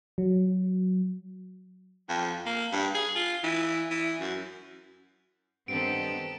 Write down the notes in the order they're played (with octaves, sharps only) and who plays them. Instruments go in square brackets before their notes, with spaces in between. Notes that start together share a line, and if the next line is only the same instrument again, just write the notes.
[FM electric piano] F#3
[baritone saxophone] F2
A#3
G2
G#4
F4
E3
E3
F#2
[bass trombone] G2 [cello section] D#3 B3 C4 [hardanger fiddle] G4 A4 [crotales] D7